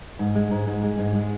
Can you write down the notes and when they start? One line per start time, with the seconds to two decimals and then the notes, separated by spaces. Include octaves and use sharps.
0.19 G#2
0.35 G#3
0.51 G#2
0.68 G#2
0.83 G#3
0.99 G#2
1.15 G#3